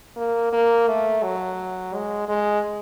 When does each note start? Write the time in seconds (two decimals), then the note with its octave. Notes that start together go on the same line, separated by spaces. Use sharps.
0.16 A#3
0.53 A#3
0.88 A3
1.23 F#3
1.94 G#3
2.28 G#3